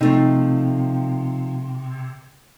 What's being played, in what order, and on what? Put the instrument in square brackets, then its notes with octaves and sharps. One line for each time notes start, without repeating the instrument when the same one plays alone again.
[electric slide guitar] C3 [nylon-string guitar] F3 A3 D#4